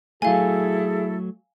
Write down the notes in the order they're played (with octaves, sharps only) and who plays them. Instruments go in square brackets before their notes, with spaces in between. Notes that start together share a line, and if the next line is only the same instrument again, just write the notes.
[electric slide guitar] F#3 A3 [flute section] E4 A4 [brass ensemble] G#4 [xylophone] F5 G#5